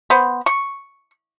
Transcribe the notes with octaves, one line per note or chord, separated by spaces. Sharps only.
B3 C5
C#6